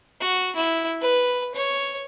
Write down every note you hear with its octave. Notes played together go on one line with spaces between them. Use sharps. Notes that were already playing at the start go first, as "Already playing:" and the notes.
F#4
E4
B4
C#5